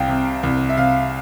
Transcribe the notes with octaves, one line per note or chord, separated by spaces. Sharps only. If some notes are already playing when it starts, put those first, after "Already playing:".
Already playing: C2 F5 G5
C3
C2
E5
C3 F5